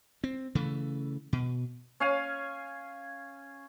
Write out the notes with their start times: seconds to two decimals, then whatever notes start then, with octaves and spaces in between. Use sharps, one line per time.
0.24 C4
0.55 C#3 E3 A3
1.33 B2
2.00 C#4 F5 G#5